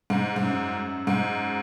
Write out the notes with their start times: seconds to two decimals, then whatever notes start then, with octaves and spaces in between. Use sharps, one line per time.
0.10 G#2
0.36 G#2
0.43 F#2
1.07 G#2